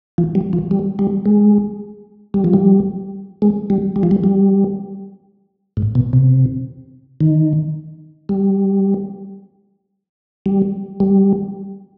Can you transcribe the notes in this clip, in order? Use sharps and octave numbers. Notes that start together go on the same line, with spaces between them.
F3
G3
F3
G3
G3
G#3
G3
F3
G3
G#3
G3
G3
F3
G3
G3
G#2
B2
C3
D#3
G3
G3
G3